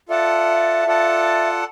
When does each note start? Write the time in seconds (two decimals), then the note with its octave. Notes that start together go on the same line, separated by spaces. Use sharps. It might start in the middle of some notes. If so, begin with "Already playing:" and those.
0.09 F4 A4 D5 E5 F#5 A5
0.86 F4 A4 D5 F#5 A5